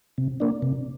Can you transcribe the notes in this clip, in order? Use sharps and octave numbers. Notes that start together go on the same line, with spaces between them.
C3
A#3 D4
C3